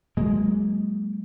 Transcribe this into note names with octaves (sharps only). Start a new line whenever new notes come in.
F#3 G#3 A#3